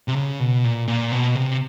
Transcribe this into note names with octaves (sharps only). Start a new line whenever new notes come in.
C3
C#3
B2
A#2
A#2
B2
C3